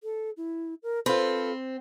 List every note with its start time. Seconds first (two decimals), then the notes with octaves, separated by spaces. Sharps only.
0.04 A4
0.37 E4
0.83 A#4
1.06 C4 F4 A4 B4